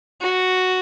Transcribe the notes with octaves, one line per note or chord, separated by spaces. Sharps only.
F#4